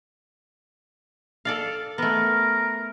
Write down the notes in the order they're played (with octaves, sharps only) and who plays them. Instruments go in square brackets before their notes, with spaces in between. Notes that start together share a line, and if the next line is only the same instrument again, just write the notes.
[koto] A4 D5 F5
[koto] A3 B3 [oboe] A#4